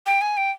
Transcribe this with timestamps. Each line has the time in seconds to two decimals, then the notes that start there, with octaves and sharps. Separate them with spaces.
0.06 G5
0.21 G#5
0.37 G5